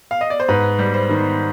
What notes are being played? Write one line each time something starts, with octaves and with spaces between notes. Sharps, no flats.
F5
D#5
D5
C5
G#2 B4
G3
C5
D#3